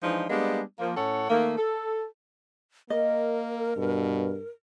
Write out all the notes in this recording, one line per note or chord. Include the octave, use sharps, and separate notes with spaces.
E3 F3 G#3 D4 D#4
G3 G#3 A#3 B3 D4
F3 A#3
A2 C#4 A4 C#5 F#5
D#3 A3 A#3
A4
A#3 A#4 D#5
G2 B2